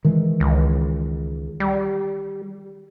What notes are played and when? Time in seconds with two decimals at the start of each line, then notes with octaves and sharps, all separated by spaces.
0.05 D#3 E3 G#3
0.40 C#2
1.60 G3